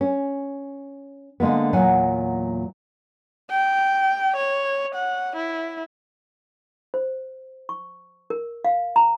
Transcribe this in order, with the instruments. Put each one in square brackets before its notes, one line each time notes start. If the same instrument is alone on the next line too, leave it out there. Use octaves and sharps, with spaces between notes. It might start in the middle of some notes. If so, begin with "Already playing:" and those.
[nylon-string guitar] C#4
D3 G#3 A#3 B3
E2 A#2 F#3 F#5 G#5
[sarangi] G5
C#5
F#5
E4
[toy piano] C5
C#6
A#4
F5
A#5